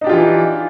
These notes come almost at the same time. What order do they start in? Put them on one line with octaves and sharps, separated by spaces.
D#4 D4 G4 F4 E3